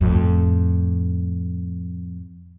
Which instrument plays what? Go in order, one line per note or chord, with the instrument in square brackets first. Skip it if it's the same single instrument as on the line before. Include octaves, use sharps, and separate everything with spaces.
[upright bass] F2 A2